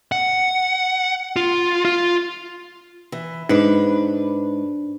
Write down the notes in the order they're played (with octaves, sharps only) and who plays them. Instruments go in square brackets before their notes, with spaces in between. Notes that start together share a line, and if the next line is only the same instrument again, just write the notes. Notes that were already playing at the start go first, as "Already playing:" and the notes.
[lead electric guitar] F#5
F4
F4
[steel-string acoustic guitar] E3
[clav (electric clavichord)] G#2 [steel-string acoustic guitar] D4 B4